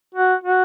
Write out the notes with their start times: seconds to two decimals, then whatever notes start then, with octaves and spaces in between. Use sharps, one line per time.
0.14 F#4
0.44 F#4